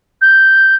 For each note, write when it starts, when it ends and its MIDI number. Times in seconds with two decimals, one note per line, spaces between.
0.21 0.75 91